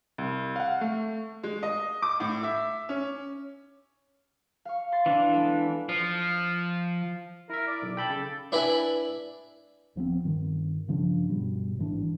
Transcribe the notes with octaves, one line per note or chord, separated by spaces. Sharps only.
C2
F5 F#5
A3
G#3
D#5
D6
A2
E5
C#4
F5 C#6
C6 A6 C7
E3 D4
G#3 B3 A4
F3
E4 A#4 E5
D5
B1
A4 G5 B5 G6
C#3
D4 E4 B4 D5 E5 G#5
D#1 F3 B3 C4
G2 D#3
G2 C#3 F3 D4
G2 B2 G3
A1 G#2 E3 D4